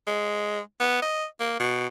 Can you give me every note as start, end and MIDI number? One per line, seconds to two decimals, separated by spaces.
0.07 0.60 56
0.80 1.00 59
1.02 1.25 75
1.40 1.58 58
1.60 1.87 47